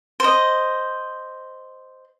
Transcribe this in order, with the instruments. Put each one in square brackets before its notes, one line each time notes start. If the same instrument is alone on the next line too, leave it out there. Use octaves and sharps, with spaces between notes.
[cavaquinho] C5 D#5